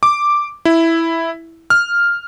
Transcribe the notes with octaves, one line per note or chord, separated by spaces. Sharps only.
D6
E4
F6